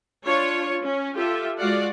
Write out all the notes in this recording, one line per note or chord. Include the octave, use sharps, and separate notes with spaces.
D4 F4 C#5
C#4
F4 G4 A4 E5
G#3 F4 F#4 D5 F5 F#5